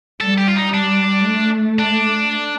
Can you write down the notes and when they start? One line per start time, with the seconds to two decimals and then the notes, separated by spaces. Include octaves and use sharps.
0.21 G3 A4
0.38 G4
0.48 F4
0.56 D#4
0.73 D4
1.27 A3
1.79 D4